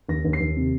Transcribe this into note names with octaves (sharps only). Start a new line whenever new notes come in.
D#2 A#6
D#2
C7
D#2
C3